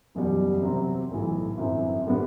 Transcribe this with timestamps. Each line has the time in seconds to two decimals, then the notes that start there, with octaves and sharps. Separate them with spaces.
0.15 F#1 E2 B2 G3
0.62 C3 F#3 C4 G4
1.10 B1 A2 E3
1.57 G1 F#2 F#3 C4 E4
2.07 A2 G3 B3